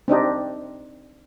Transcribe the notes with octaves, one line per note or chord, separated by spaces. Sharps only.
C4 D4 D#4 G4